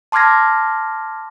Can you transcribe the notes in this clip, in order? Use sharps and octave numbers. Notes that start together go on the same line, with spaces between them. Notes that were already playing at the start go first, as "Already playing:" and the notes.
A5 C6 D6 F6 G#6 A#6